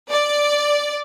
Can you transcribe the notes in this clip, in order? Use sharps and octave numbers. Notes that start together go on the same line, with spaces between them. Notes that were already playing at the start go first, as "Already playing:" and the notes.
D5